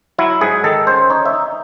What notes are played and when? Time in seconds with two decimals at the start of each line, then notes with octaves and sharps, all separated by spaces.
0.18 F#3 E4
0.41 G#2 G#4
0.64 D#3 A4
0.87 C#4 C5
1.10 D#4 C#5
1.25 E5
1.34 D#4